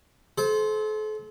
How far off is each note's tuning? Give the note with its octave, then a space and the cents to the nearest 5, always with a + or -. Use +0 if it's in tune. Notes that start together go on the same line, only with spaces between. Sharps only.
A4 -40 C5 +0